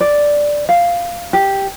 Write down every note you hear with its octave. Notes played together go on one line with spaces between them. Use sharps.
D5
F5
G4